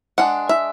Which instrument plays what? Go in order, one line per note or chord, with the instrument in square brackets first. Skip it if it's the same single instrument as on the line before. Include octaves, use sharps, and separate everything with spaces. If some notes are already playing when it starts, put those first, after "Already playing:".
[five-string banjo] G#3 D4 F#5
E5